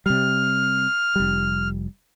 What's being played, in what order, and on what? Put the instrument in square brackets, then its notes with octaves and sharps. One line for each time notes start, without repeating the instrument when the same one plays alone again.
[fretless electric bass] C3 G3 [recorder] F6
[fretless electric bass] F1 G3